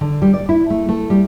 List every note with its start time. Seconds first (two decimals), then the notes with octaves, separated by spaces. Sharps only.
0.01 D3
0.22 G3
0.34 D5
0.49 E4
0.70 A3
0.89 A3
1.10 G3